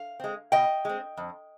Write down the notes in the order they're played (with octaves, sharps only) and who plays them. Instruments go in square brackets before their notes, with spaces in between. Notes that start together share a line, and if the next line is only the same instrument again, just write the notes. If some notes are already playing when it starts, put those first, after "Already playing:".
Already playing: [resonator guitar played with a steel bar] F5
G#3 C4
B2 D#5 G5
G#3 C4
F2